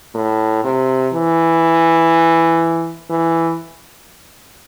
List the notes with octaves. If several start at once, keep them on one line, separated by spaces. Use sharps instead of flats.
A2
C3
E3
E3